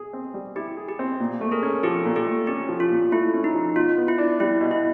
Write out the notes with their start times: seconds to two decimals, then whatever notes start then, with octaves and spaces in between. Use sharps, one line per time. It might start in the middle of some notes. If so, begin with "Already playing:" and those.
Already playing: G#4
0.13 C4
0.34 G3
0.56 E4 G4
0.77 G#4
0.89 G4
0.99 C4
1.20 A#2
1.41 A3
1.51 G#4 A#4
1.63 C#4
1.83 F3 G4 A4
2.05 A#2
2.16 G4 A4
2.27 A3
2.47 C#4 G4
2.69 F3
2.80 F4
2.91 A#2
3.12 A3 E4
3.33 C#4
3.44 D#4
3.54 F3
3.75 B2 F4
3.97 B3
4.08 E4
4.18 D4
4.40 G3 E4
4.61 B2
4.71 E4